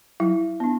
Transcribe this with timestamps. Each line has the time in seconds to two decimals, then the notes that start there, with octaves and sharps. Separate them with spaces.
0.20 F#3 E4
0.60 B3 D4